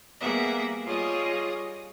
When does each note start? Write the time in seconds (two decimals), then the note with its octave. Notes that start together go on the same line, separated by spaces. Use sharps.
0.20 G3 A#3 B3 G#4 E5 F#5
0.84 G3 F4 G#4 C#5 D#5